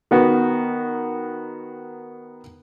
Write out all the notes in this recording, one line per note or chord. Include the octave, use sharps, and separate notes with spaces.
D#3 B3 F#4